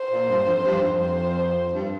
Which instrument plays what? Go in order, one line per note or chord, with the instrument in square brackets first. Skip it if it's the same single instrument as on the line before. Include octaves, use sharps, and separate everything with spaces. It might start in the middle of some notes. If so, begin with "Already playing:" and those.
Already playing: [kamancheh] C5
[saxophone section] A#2
G2
F2
G2
F2
[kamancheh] C5
[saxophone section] G2